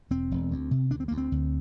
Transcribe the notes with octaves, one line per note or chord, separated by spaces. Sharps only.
E1 C4
E1
D2
C3
D2 D4
C4
D2 A#3
C4
D2